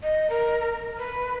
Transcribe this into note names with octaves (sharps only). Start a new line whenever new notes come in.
D#5
A#4
A#4
B4